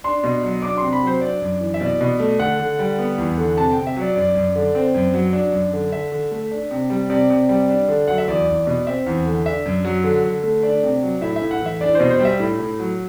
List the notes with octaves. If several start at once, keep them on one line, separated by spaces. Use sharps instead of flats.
D4 C6
B2
F#3
D4 D6
C3 C6
B5
F#3 C5
D4 D5
F#2
E3
E5
B2 D5
B2
A3
D3 F#5
D3
G3
B3
E2
D3
C3 A5
C3 G5
E5
F#3 D5
F#2 D5
F#2
D3
C4
F#2
F#3
D4
F#2
D3
D3 E5
D3
A3
D4
C3
G3
C3 D5
C3
G3
D4
D3
F#3 F#5
E5
E2 D5
E2
B2
C4 E5
E2
D3
D4 E5
F#2
F#3
D3
D3
A3
D4 D5
C3
F#3
A2 E5
E5
A2
F#5
E3 E5
D4 D5
B2 C5
C5
G3
E5
A2
A2
F#3